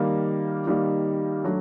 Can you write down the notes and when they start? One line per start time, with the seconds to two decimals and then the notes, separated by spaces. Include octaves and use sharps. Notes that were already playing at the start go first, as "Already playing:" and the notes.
Already playing: D#3 G3 A#3
0.67 D#3 G3 A#3
1.44 F#3 A3 D4